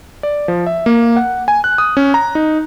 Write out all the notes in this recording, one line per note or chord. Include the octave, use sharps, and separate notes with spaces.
D5
F3
E5
A#3
F#5
G#5
F#6
D#6
C#4
A#5
D#4